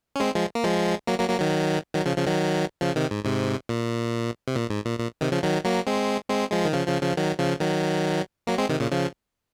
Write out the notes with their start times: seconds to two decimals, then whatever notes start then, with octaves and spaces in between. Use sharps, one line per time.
0.16 C#4
0.20 G#3 C4
0.35 F3 G#3
0.55 A#3
0.64 F3 G#3
1.07 F#3 A#3
1.19 F#3 A#3
1.29 F#3 A#3
1.40 D#3 F#3
1.94 D#3 F#3
2.05 C#3 F3
2.17 C#3 F3
2.27 D#3 F#3
2.81 C#3 F3
2.96 C3 D#3
3.11 G#2
3.25 G#2 C3
3.69 A#2
4.48 C3
4.56 A#2
4.70 G#2
4.85 A#2
5.00 A#2
5.21 C3 D#3
5.32 C#3 F3
5.43 D#3 F#3
5.65 F#3 A#3
5.87 G#3 C4
6.29 G#3 C4
6.52 F3 G#3
6.65 D#3
6.73 C#3 F3
6.87 C#3 F3
7.02 C#3 F3
7.17 D#3 F#3
7.39 C#3 F3
7.60 D#3 F#3
8.47 F#3 A#3
8.58 G#3 C4
8.69 C3 D#3
8.80 A#2 C#3
8.91 C#3 F3